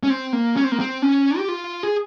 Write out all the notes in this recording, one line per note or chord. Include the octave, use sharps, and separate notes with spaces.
C#4
C4
A#3
C#4
C4
A#3
C4
C#4
G4
F4
G#4